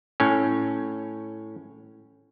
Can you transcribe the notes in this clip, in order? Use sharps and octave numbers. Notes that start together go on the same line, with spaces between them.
A2 C#4